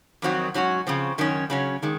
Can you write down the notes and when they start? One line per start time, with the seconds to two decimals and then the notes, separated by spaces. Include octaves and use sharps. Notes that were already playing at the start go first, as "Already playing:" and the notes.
0.22 F2 D#3 F#3 C4 F#4
0.54 G#2 F#3 C#4 F#4
0.87 C#3 F3 C4
1.18 F#2 D#3 F#3 C#4
1.50 C#3 F#3 C#4
1.83 D#3 G#3